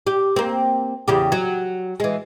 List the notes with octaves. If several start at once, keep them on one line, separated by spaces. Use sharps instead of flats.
G4
A#3 C4
E2 C#3 G4
F#3
E3 G#3